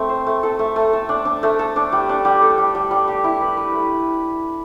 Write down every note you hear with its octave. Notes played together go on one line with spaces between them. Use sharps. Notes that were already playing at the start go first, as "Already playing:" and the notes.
Already playing: A3 C4
C5
A3
A4
A3
A3
A4
D4
D4
A3
A4
D4
G3
D4
G3
A4
G3
G3
G3
G4
E4
B4
B4
A3